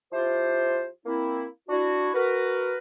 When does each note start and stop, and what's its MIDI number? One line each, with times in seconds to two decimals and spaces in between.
0.12 0.86 53
0.12 0.86 64
0.12 0.86 65
0.12 0.86 67
0.12 0.86 72
1.05 1.46 58
1.05 1.46 60
1.05 1.46 64
1.68 2.10 62
1.68 2.10 64
1.68 2.10 66
2.14 2.77 66
2.14 2.77 70
2.14 2.77 71